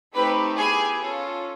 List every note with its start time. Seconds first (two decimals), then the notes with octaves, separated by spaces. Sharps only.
0.14 A3 C4 D#4 G4 B4 B5
0.57 B3 E4 G4 G#4 G#5
1.01 C#4 F4 A4